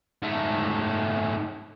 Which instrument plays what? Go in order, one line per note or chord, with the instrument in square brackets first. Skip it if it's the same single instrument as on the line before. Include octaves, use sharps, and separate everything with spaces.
[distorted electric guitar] G#2 A3